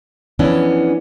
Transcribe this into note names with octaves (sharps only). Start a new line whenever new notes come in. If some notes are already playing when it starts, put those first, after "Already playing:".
F2 E3 B3 C#4 D4